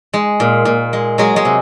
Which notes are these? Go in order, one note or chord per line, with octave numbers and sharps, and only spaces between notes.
G#3
A#2
A#2
G#3
F#3 G#3 G#4
G#3 G#4
C3